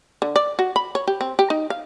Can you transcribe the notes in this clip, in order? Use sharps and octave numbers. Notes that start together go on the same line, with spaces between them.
D3
D5
F#4
B5
C#5
G4
C4
G4
D#4
F5